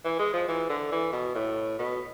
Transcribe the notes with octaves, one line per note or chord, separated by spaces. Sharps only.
E3
G#3
F3
E3
D3
E3
B2
A2
B2